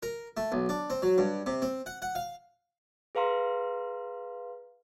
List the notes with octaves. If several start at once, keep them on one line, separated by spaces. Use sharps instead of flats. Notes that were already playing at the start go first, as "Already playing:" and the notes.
A#4
A3
B1
D4
C4
F#3
G2
C3
C4
F#5
F#5
F5
G#4 B4 F5 A#5 C6